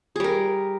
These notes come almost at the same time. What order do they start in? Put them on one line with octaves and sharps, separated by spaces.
G#4 G3 A#4